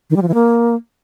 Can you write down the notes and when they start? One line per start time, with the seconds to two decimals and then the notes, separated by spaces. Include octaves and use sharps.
0.10 D#3
0.16 G3
0.22 F3
0.28 E3
0.34 A#3